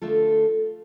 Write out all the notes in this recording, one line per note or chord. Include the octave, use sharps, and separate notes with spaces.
D3 A3 F4 A4